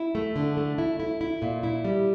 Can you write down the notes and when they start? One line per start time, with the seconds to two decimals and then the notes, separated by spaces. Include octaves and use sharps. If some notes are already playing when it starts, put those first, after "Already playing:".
Already playing: E4
0.15 A3
0.36 D3
0.57 A3
0.78 E4
1.00 E4
1.21 E4
1.42 A#2
1.63 E4
1.84 G3